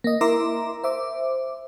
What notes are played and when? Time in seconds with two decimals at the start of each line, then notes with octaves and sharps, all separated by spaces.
0.04 A#3 D#5
0.21 E4 A#4 E5 A#5 C6 D6
0.84 C5 E5 D6